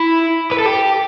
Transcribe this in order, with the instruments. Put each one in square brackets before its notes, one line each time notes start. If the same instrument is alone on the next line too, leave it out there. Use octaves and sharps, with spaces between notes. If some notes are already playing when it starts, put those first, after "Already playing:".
Already playing: [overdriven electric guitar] E4
B4
A4
G4